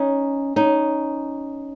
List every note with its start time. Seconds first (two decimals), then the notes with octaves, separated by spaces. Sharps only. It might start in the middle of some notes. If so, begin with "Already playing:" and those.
Already playing: C#4 D#4
0.56 C#4 D#4